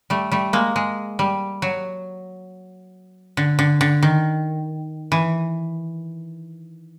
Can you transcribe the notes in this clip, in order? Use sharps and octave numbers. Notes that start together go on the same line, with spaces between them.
G3 A3
G3 A3
G#3 A#3
G#3
G3
F#3
D3
D3
D3
D#3
E3